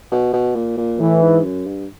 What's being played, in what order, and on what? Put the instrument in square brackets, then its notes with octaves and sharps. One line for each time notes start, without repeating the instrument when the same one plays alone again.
[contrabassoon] B2
B2
A#2
A#2
[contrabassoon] A2 [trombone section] E3
[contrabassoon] G#2
F#2
G2